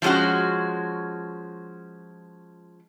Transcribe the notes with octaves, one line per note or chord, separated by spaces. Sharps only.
F3 G3 G#3 C#4 F#4